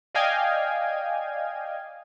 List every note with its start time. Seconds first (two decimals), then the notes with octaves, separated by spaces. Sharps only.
0.15 D5 D#5 F5 G5 G#5 G#6